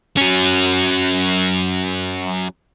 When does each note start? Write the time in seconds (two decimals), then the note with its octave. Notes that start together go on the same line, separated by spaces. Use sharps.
0.17 F#3 C#4